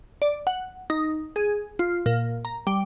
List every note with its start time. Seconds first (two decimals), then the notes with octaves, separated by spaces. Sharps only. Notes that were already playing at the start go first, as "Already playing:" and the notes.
0.22 D5
0.47 F#5
0.90 D#4
1.36 G#4
1.79 F4
2.06 A#2
2.45 A#5
2.67 G3